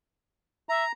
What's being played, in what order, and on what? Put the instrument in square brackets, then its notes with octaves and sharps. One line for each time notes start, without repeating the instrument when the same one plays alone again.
[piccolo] E5 [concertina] A#5